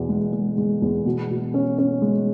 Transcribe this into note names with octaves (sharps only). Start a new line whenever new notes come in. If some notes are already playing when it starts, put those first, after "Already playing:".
Already playing: E2 B2
G#3
G#3
G#3
E2
B2
B2
C#4
C#4
G#3